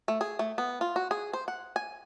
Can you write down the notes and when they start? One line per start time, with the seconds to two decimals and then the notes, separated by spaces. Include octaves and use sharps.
0.08 A3
0.21 G#4
0.39 A3
0.58 B3
0.81 F4
0.96 F#4
1.11 G#4
1.33 C5
1.48 F#5
1.76 G#5